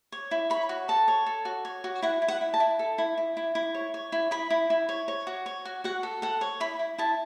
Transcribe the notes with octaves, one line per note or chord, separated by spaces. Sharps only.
C#5
E4
C#5 B5
F#4
A4 A5
C#5
A4
F#4
C#5
F#4
E4 F#5
E4
F#5
E4
A5
E4
A4
E4
E4
E4
E4
C#5
C#5
E4
E4 B5
E4
E4
C#5
C#5
F#4
C#5
F#4
F#4 F#5
A4
A4 F#5
C#5
E4 B5
E4
E4 A5